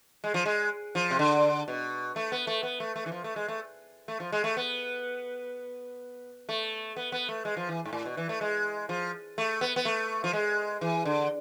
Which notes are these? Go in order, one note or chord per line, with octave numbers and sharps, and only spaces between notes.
G#3
F3
G#3
F3
C3
D3
B2
A3
B3
A3
B3
A3
A3
E3
F3
A3
G#3
A3
A3
F3
G#3
A3
B3
A3
B3
B3
A3
G#3
F3
E3
G#2
A2
B2
E3
A3
G#3
F3
A3
B3
B3
A3
F3
G#3
E3
D3